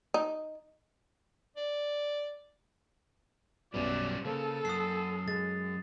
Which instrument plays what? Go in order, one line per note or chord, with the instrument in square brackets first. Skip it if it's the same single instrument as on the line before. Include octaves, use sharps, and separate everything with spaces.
[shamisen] D#4
[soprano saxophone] D5
[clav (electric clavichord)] B1 F#2 B2 [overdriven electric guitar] G3 C#4 [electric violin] D5
[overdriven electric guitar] C#3 [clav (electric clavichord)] A#3 C5 A5 [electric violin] A4
[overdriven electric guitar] F#2 [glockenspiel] D#6 C7
[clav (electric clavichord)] G#3 [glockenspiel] A6